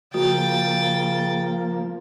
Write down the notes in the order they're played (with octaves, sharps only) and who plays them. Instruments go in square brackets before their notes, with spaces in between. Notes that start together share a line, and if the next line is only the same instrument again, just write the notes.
[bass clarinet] C#3 [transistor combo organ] F3 A#3 [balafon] F#4 [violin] G5 A6